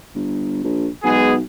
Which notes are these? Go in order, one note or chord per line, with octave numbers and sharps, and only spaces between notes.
G1
A#1
B1 G#3 B3 G#4